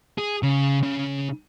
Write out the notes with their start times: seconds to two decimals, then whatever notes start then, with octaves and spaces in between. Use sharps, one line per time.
0.18 G#4
0.43 C#3
0.83 C#3